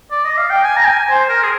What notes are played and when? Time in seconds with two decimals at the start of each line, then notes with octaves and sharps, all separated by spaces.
0.11 D5
0.25 D#5
0.38 F5
0.50 G5
0.64 G#5
0.76 A#5
0.85 G5
0.90 G#5
1.10 C5
1.29 A#4
1.43 G#4